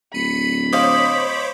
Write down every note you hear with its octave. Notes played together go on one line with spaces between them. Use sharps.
D1 B5 C#7 D#7
C5 C#5 D#5 F5 D6